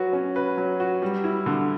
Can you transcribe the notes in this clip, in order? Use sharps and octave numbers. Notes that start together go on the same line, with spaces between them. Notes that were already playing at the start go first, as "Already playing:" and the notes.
Already playing: F#3 F#4 B4
C#4
B4
F#3
F#4
G3
E4
D3